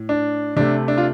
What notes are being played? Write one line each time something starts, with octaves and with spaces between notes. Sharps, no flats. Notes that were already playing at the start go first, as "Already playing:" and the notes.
Already playing: A2
D4
C3 A3 D4
D4
F4